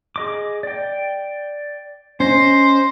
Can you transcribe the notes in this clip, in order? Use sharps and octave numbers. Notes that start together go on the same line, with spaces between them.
G#4 D#5 D6
D5 G5
C#4 C5 D#5